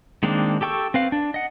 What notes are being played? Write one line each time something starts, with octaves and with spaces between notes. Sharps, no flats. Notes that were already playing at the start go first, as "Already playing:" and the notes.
D#3 G#3 A#3 C4 D4
G4 A4 G5 C#6 E6
C4 B4 F5
D4
D#5 F#5